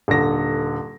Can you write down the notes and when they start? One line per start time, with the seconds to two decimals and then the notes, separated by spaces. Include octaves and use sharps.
0.08 D#1 D3 A#6